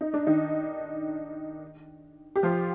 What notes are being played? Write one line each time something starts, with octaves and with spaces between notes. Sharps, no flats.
D#4
D4
D#3 D#4
G4
F3 F4